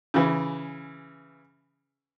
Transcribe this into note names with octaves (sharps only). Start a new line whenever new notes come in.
C#3 E3